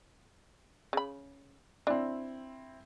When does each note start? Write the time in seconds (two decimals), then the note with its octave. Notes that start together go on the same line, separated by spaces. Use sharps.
0.93 C#3 B5
1.87 C4 D4 E4